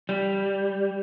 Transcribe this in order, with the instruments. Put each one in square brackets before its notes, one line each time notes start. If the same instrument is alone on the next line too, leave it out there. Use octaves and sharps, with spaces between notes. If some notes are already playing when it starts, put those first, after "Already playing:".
[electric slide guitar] G3